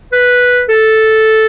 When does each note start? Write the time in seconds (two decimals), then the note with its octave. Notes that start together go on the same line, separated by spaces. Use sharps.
0.13 B4
0.69 A4